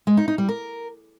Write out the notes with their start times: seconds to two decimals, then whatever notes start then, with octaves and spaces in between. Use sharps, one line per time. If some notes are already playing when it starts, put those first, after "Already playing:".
0.07 G#3
0.17 D#4
0.28 D#4
0.38 G3
0.49 A#4